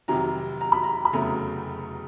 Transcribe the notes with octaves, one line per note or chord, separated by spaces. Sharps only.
F1 F2 C3 D#3 F#3 A#5
A#5
B5
A#5
B5
F1 E2 C#3 F#3 A3 A#5